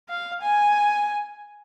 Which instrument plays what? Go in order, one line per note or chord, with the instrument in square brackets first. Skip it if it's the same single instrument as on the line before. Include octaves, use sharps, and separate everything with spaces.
[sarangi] F5
G#5